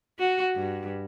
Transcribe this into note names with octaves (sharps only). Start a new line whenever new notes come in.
F#4
G2